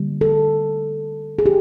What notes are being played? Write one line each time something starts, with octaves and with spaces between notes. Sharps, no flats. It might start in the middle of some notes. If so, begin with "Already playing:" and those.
Already playing: D3 G3 A#3
A4
G#4
G4